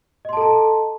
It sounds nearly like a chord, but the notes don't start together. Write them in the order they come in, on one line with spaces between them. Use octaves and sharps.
D#5 C6 A5 A4 A#5